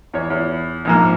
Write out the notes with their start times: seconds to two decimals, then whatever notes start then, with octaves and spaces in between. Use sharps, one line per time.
0.14 E2 C#5
0.30 E2
0.85 A#1 G#2 A#3